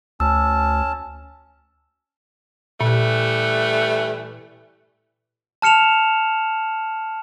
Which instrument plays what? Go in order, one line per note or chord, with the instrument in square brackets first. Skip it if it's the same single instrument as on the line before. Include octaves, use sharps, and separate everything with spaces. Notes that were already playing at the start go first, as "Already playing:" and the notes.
[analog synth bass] D2 [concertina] C#4 A5 [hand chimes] E6
[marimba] A#2 [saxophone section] E3 G3 A3
[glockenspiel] A5 F6 C#7 E7 F7